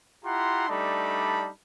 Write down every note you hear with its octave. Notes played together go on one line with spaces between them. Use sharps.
E4 F4 G4 F#5 A#5 C6
G3 A3 D4 D#4 A5 B5